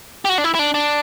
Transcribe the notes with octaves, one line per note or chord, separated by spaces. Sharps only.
G4
F#4
D4
E4
E4
D4
D4